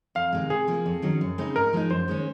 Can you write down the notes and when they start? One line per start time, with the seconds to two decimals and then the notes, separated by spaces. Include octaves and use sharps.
0.15 F2 F5
0.33 C3 D#3 G#3
0.50 C3 G#4
0.68 F3 A#3
0.86 F2
1.02 D#3 F#3 C#4
1.21 F#2
1.38 C#3 G#3 C4 D#4
1.56 G#2 A#4
1.73 F3 G#3 D#4
1.90 F#2 C5
2.08 D#3 G#3 C#4